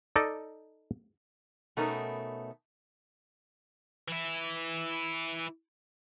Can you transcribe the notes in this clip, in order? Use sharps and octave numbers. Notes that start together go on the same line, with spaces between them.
D#4 A4 D5 D#5
B2 A3 B3 C#4 D#4 A#4
E3 E4